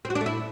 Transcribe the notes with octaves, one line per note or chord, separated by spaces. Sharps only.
C4
F#4
D4
A3
E4